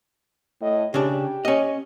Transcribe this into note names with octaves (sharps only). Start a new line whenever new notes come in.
A2 D#5
C#3 D4 G4
C#4 D#5